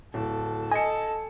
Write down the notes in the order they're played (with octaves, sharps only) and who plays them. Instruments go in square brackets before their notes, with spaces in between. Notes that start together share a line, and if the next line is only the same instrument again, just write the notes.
[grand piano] D1 [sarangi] A4
[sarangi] A4 [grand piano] D#5 C#7 [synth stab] G#5